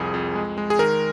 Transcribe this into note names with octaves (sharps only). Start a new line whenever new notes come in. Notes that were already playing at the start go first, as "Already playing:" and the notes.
Already playing: C2 F2 G#4
F2
G#3
G#3
G#4
D#3 A#4